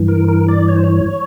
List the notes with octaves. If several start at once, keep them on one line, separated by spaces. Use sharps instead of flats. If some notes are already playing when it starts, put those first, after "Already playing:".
Already playing: G2 E3
A#4
A#4
D5
C#5
C5
C#5